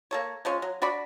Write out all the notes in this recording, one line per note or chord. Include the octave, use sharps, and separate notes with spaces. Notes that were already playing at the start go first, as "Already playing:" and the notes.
A#3 A4 C#5
F3 G#3 C#4
F#3
D4 F#4 D5 B5